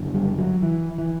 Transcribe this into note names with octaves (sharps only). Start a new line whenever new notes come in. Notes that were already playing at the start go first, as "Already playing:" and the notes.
Already playing: F#1 F#2 D3
G3
F#3
E3
E3